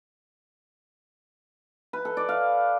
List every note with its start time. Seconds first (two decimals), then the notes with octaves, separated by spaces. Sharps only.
1.93 B4
2.05 A4
2.17 D5
2.29 F5